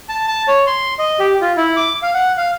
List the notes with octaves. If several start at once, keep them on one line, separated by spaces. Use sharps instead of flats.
A5
A5
C#5
C6
D#5
G4
F4
E4
D6
F5
F#5
F5